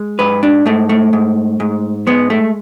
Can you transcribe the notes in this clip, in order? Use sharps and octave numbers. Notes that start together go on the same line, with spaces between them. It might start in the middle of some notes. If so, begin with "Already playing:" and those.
Already playing: G#3
G#2 B4
D4
G#2 A3
A3
G#2
G#2
G#3 B3
A3